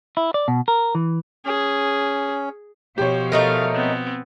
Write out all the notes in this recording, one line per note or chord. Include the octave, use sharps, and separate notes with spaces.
E4
D5
B2
A#4
E3
C#4 G#4
B2 F3 G4 C5 C#5
A3 D#4 A#4 F5
B3 C4